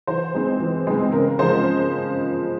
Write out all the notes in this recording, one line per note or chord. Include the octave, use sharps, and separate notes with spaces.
E3 C5
G#3 C4
E3
G#3 C4
C#3 A#4
F3 G#3 C5